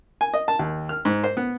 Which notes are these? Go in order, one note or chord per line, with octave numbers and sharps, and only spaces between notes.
G#5
D#5
A5
D#2
F6
G#2
C5
B3